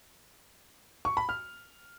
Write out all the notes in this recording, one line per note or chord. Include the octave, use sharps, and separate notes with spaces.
C#6
B5
F6